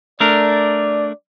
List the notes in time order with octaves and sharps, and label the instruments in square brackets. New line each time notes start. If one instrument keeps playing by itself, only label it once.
[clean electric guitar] A3 D4 A#4 [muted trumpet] D5